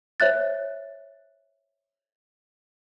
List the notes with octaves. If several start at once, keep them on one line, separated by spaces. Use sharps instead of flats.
C5 C#5 E5 F#6 A6